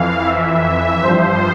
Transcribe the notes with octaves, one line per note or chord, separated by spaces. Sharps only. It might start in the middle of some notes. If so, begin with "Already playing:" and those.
Already playing: F2 E3 F5
E5
G2 F3 C5